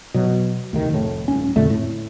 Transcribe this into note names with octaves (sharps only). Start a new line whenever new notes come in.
B2 F#3
D2 C3 D#3
F1 A2
D#1 C#4
F2 A#2 D3 A3
A2